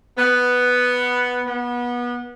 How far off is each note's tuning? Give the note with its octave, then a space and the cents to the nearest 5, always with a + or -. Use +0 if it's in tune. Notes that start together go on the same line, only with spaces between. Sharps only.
B3 +0
B3 -25